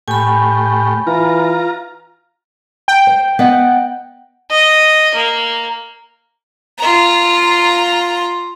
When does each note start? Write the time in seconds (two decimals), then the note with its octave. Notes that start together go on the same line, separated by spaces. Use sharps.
0.08 A2 G4 G#5 B5
1.07 E3 F4 A#5
2.88 G5
3.07 C5
3.39 B3 D#5 F#5
4.51 D#5
5.14 A#3
6.78 F4 A#5